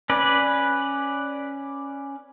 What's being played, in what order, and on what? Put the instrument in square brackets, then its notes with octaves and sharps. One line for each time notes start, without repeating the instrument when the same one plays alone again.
[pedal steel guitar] C#4 B4 D5